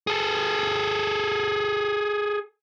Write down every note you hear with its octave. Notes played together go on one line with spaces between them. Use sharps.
G#4 A4